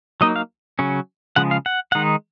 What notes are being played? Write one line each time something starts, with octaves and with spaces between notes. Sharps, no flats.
F#3 A#3 D#4 D#5
F5
C#3 F#3 C#4
C#3 F3 G#3 F#5
F5
F#5
D#3 G#3 D#4 F#5